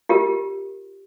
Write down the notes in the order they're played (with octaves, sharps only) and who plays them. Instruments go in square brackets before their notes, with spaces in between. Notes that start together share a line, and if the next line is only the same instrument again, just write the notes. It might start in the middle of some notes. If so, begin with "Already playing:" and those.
[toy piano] F4 G4 A#4